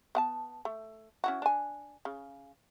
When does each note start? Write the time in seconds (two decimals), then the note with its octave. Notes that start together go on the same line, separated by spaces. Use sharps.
0.15 B3 F#5 A5
0.65 A3
1.24 C#4 E4 F#4
1.42 D4 G#5
2.05 C#3